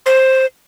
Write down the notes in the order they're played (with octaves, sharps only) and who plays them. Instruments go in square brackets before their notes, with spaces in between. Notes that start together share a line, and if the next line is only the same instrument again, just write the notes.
[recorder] C5